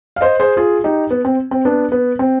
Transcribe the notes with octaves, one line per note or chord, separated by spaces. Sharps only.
F5
C5 D#5
G#4 C5
F4 G#4
D#4 G4
B3
C4
C4
B3 D4
B3
C4